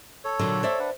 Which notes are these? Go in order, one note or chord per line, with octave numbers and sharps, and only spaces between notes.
A4 C#5
A#2 D3 F#3
C5 D5 E5
D4 B4 F#5